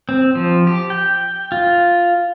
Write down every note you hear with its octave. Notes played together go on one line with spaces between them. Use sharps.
C4
F3
G4
G5
F4